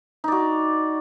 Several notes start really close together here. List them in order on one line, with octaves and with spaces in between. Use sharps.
D#4 D5 F#4